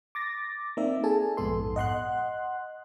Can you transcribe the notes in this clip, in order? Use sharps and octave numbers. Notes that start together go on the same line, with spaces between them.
D6 A6 A#6
A#3 C4 D#4 D5 E5
G#4 A4 G#5 A5
A#1 F2 G#2 B3 A4 C6
D#5 F#5 C6 F#6